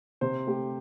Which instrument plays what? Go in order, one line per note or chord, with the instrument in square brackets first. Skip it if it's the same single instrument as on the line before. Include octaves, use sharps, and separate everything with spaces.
[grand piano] C3 C5
A3 G4